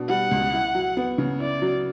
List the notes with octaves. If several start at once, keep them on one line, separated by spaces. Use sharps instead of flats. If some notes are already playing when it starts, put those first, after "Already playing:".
Already playing: B2 D4
G3 F#5
C#2
E4
F#3
B3
C#3
E4 D5
F#3